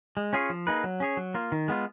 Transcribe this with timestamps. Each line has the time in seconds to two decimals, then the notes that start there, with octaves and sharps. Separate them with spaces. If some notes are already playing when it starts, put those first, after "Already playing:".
0.17 G#3
0.33 C#4 F4 G#4 C#5
0.50 F3
0.67 A#3 D#4 G#4 B4
0.84 F#3
1.00 C#4 G#4 C#5
1.17 F#3
1.34 A#3 F4
1.52 D#3
1.68 G#3 B3 F4